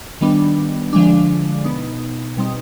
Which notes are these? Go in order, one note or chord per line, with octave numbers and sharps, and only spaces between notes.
D#3 G3 B3 D4
D3 F3 G#3 D4
B2 B3 D#4
B2 G3 C4 D#4